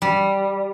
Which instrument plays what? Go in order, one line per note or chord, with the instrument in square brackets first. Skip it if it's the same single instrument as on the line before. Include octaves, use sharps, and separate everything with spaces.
[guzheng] G3